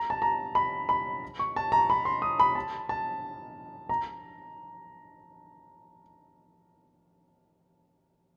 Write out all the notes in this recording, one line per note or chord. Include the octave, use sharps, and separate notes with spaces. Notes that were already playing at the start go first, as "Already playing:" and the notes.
Already playing: A#5
A5
A#5
B5
B5
C#6
A5
A#5
B5
C6
D#6
B5
A5
A5
A#5